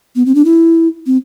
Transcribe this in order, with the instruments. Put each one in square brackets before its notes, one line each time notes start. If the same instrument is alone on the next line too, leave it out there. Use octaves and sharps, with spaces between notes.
[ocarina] B3
C4
D4
E4
C4